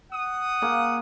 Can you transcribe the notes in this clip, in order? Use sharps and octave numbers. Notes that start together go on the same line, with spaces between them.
F#5 D#6
A#3 G#4